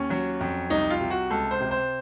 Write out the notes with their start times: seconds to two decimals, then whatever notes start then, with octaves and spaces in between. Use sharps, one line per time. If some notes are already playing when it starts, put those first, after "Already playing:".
Already playing: D#2 C#4
0.10 F#3
0.40 F2
0.70 C2 D#4
0.90 F4
1.01 C3
1.10 F#4
1.30 C#2 A4
1.51 C5
1.60 C3
1.71 C5